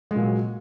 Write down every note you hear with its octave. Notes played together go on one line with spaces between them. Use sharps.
A#2 F#3 G#3